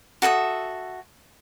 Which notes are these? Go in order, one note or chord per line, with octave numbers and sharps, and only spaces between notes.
F#4 A4 E5 D#6